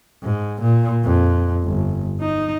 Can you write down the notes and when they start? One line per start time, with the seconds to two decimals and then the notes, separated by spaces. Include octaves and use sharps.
0.24 G#2
0.62 A#2
1.04 F2
1.63 G1
2.21 D#4